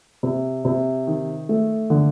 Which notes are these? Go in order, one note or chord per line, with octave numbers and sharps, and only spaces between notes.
C3
C3
D#3
A3
D3